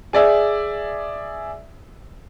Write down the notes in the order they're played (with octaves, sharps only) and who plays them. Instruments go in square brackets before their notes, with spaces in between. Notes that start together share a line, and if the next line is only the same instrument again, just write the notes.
[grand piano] G#4 D5 E5